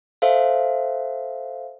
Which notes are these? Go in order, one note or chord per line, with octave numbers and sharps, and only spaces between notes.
A4 C5 E5 F5